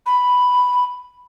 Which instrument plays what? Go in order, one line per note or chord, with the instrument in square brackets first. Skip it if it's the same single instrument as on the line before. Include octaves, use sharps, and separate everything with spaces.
[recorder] B5